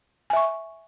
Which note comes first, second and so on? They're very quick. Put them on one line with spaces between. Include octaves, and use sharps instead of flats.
G#5 E5 C#6